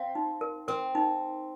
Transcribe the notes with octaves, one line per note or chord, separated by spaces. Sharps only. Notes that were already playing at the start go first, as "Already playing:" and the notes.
Already playing: C4 F5
D#4
A#4
C4 A#4
D#4